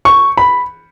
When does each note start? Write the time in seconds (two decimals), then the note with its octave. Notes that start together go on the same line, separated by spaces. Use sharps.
0.05 C#6
0.37 B5